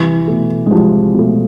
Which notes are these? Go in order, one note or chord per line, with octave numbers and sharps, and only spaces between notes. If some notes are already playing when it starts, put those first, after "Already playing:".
Already playing: C2 E3
B2 A3
G#3
C2 F3
B2 A3